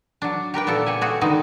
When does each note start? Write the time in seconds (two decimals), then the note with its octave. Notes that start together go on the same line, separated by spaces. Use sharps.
0.22 F#3 D4
0.54 G4 A#4 B4 G5
0.67 A#2 B3 G4 A4
0.86 C#3 G4 F#5 G#5
1.01 A3 F#4 G#4
1.21 D3 D#3 G#3 B3 D#4